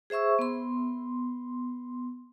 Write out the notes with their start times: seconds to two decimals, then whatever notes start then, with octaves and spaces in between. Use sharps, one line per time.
0.10 G#4 C5 E5 C#6 E6
0.39 B3 C6